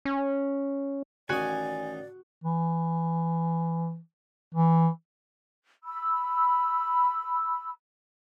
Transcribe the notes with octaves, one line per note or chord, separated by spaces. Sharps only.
C#4
A1 D#3 F#4 D5 G#5 D#6
E3
E3
B5 E6